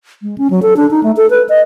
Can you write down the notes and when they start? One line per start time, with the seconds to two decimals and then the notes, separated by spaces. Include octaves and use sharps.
0.22 G#3
0.38 C#4
0.50 F#3
0.62 A4
0.77 D4
0.91 D#4
1.03 A3
1.17 A4
1.30 B4
1.49 D#5